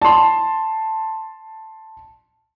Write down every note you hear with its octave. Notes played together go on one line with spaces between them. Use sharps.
A5 C6